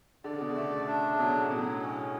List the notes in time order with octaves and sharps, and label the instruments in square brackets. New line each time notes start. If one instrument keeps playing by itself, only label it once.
[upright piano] D3 [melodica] D5
[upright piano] C#3
B2
C#3
[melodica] A3
D4
[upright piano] C#3
[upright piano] B2 [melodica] F#3
[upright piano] A2
[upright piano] B2 [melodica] F#3
[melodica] C#4